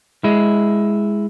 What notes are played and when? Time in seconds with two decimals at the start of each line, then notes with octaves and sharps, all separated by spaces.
0.24 G#3 E4